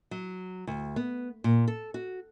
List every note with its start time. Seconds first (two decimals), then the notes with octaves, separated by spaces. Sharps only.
0.11 F#3
0.67 D2
0.96 B3
1.44 A#2
1.68 A4
1.94 F#4